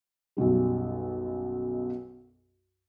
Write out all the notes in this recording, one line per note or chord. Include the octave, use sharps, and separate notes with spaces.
B1 F#2 B2 G3